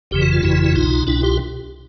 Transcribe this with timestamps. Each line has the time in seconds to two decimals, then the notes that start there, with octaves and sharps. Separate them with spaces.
0.11 G1 F2 C#3 E3 G4
0.21 F#4
0.33 F4
0.43 G1 F2 C#3 E3 E4 F#4
0.64 F#4
0.75 C2 B2 D#4 F4
1.07 C2 B2 D4 E4
1.23 F4 G4